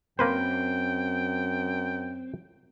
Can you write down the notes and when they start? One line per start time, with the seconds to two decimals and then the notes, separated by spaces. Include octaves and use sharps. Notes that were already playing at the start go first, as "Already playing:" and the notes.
0.19 F#2 A#3 C4 B4 C5 G5